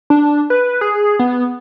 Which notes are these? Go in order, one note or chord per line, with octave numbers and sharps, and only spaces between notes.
D4
B4
G#4
B3